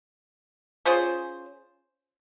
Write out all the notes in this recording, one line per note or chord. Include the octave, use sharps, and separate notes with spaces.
C#4 F4 G#4 C5